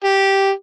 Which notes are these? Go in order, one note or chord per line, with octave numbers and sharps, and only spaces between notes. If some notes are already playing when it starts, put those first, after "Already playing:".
G4